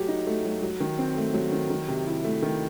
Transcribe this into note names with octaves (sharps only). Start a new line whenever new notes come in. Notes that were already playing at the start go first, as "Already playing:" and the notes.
Already playing: F#3 A3 G4
D#4
A3
F#3
F#3
D#3
C4
A3
F#3
D#3
D#3
C3
E4
A3
D#3